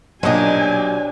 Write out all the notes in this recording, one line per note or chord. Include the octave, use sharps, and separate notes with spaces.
B1 A#2 F#3 D4 G4 C5 D#5 G#5